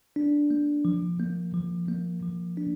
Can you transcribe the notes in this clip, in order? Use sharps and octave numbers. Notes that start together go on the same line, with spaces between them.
D4
A#3
F3
A#3
F3
A#3
F3
D4